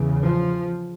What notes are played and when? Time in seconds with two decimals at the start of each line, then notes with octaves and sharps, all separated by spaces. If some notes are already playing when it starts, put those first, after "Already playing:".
Already playing: E2 C#3
0.23 F3